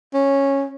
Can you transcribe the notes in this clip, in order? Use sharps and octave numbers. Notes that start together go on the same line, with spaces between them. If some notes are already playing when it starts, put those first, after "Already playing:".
C#4